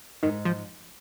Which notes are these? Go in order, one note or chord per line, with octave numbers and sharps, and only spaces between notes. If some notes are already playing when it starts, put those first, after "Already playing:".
G#2 D#3
F3